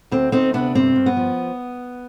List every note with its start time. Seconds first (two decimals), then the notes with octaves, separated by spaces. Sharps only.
0.11 D2 C4
0.32 D2 C4 D#4
0.53 C3 B3 D4
0.75 G2 C4
0.96 G2
1.06 B3
1.17 F3